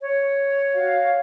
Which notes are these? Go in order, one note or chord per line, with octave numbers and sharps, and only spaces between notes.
C#5
F#4 F5